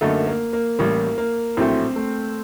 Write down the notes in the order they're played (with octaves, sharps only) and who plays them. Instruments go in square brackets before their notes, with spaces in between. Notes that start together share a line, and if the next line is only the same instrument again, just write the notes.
[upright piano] F#2 D3 A3 D#4 A4 [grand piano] A#3
[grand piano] A#3
A#3
[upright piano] A1 A2 G3 [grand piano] A#3
[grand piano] A#3
[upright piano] A#1 A2 F#3 A3 [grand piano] C4
[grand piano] A3